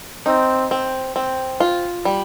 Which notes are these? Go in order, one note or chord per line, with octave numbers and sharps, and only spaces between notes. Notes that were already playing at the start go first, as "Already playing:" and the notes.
C4 D#4
C4
C4
F4
G3